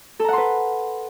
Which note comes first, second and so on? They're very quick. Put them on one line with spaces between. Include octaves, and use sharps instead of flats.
A4 A#5 F#5 C6 B4